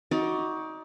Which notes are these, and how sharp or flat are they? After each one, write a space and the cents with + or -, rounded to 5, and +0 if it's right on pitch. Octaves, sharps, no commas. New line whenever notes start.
D#4 +25 F#4 +0 D5 +0